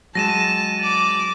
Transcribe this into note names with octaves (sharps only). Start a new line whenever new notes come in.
F#3 G#3 A5 A#6 D#7 E7
D5 D6